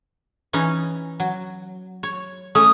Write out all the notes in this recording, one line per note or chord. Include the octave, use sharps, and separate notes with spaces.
E3 C#4 D#4
F#3
C#5
A3 C#4 D#6